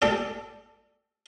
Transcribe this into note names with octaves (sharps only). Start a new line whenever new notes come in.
G4 A4 D5